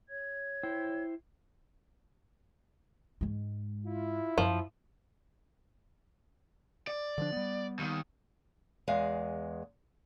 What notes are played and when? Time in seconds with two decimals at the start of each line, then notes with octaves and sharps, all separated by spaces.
0.08 C#5 G#6
0.63 E4 C5 G5
3.21 G#2 G#3
3.85 E4 F4
4.38 F#2 F3
6.87 D5
7.18 D3 F3 D4
7.32 G3 B3
7.79 D#2 D#3
8.88 E2 G#3 F5